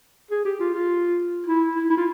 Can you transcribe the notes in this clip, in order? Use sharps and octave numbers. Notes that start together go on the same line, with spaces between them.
G#4
G4
F4
F4
E4
E4
E4
F4